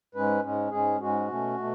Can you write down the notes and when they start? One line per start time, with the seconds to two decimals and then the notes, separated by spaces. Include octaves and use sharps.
0.15 G#2 G#3 C#4 B4
0.43 G#2 G#3 C#4
0.71 G#2 G#3 C#4 G#4
1.00 G#2 G#3 C#4 F#4
1.28 B2 A3 C#4
1.58 B2 A3